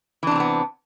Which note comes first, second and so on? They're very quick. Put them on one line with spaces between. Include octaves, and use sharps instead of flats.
E3 D4 C3 C4 B3